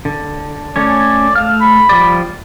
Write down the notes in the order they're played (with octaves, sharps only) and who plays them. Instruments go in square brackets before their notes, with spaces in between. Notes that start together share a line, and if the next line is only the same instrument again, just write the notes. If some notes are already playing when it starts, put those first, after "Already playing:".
[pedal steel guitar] D3
[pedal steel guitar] A3 C#4 C#5 [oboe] D5
[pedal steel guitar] A3 F6 [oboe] F5
[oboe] B5
[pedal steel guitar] F3 G3 D5